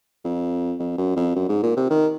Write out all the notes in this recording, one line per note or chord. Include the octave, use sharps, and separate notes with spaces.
F2
F2
F#2
F2
F#2
G#2
A#2
C3
D#3